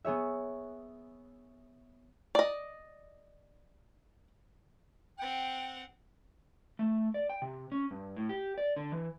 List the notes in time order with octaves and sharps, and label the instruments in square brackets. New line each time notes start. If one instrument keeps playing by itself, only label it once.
[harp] B3 G#4 C#5 E5
[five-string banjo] D5 D#5
[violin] C4 F#5 [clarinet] G5
[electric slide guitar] A3
D5
G5
C3
C#4
G2
A2
G4
D5
D3
E3